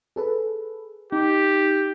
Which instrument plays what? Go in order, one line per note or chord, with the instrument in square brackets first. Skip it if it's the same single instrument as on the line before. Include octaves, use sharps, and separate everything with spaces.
[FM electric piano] G#4 A4 B4
[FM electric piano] D#4 [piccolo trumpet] G4